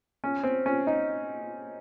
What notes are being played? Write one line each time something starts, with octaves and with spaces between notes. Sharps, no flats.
C#4
C4
C#4
D#4